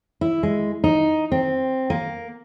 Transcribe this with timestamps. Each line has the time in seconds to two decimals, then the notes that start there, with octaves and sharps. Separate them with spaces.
0.21 E4
0.43 G#3
0.84 D#4
1.32 C4
1.90 A#3